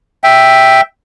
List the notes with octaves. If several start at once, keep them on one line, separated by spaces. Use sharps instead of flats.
E5 G5